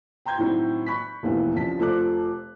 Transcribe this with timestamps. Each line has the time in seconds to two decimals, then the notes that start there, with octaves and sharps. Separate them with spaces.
0.26 G5 A#5 C6 G6 G#6
0.38 A2 D#3 F#3 C4
0.86 B5 C#6 F#6 B6
1.23 F1 D#2 B2 E3
1.54 C2 C#3 F3 A5 B6
1.79 F1 F4 A4 C5 D6 F#6